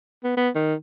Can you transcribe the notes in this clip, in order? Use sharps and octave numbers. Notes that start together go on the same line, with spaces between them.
B3
B3
D#3